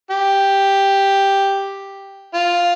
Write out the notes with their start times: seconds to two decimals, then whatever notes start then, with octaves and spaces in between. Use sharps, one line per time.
0.11 G4
2.34 F4